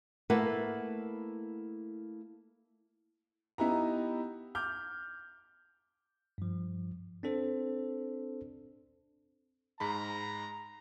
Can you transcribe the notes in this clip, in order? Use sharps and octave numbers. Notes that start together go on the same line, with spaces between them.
A3 A#3 E4 B4 F#5
B3 D#4 E4 G4 B4 A#5
D6 F6 G6
G2 F3
C4 D4 A4 C5
G#2 G#3 A#5 B5